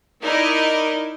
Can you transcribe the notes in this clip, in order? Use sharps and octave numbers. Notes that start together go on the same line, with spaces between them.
D#4 E4 A#4 D5 D#5